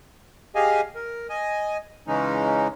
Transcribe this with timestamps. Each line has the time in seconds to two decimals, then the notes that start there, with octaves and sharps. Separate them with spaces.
0.55 G4 G#4 D#5 F5 G#5
0.95 A#4
1.29 D#5 G#5
2.07 C#3 E3 G#3 C#4 D#4